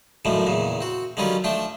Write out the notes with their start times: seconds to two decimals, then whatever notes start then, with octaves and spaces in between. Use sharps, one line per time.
0.25 F#2 A2 D3 D#3 F3
0.47 E2 A#2 C#3
0.81 C4 F#4
1.17 D3 D#3 F#3 G3 C#4 F4
1.44 F3 A3 D4 G5